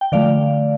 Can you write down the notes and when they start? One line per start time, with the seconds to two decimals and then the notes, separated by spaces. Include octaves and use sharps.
0.01 G5
0.12 D3 F3 A3 D5 F5